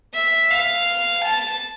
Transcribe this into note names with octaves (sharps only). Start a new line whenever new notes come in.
E5
F5
A5